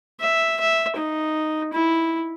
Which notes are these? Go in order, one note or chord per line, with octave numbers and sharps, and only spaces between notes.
E5
E5
D#4
E4